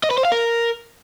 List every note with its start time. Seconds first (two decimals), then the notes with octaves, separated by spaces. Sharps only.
0.03 D#5
0.11 B4
0.18 C5
0.25 F5
0.32 A#4